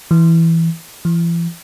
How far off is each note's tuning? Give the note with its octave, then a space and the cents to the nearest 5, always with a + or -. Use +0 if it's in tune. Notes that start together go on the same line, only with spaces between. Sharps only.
E3 +0
E3 +40